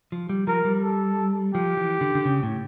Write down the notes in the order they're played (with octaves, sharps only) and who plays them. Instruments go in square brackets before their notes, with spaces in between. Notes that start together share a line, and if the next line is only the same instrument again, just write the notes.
[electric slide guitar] F3
G3
[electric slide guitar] F3 [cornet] A#4
[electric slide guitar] G3
[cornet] A4
[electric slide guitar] F3 [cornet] G4
[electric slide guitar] E3
D3
D3
C#3
A2